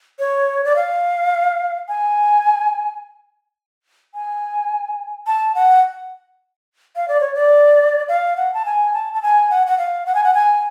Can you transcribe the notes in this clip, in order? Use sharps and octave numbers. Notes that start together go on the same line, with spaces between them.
C#5
D5
F5
G#5
G#5
A5
F#5
F5
D5
C#5
D5
F5
F#5
A5
G#5
A5
A5
G#5
F#5
F#5
F5
F#5
G#5
F#5
G#5